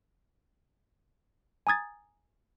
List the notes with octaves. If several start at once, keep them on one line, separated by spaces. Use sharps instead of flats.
G#5 A#5 D#6 G#6 A6